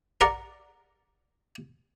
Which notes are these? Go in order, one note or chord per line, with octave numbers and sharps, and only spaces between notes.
A#4 D5 F#5 A#5